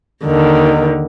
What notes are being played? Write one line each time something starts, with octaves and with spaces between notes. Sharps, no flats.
D#2 D3 D#3